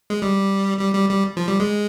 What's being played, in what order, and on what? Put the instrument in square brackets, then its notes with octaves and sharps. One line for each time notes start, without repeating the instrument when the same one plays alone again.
[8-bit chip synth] G#3
G3
G3
G3
G3
F3
G3
G#3